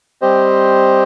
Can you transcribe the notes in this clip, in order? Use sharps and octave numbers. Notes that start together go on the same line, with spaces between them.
G3 C4 G4 C5 D#5